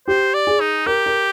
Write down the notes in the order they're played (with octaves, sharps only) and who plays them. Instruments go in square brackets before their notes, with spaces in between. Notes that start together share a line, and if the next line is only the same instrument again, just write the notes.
[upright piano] G4 [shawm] C5
[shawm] D5
[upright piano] G#4
[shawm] D#4
[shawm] G4 [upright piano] A#4
[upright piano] A#4